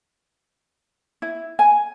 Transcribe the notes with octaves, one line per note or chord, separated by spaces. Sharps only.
E4
G#5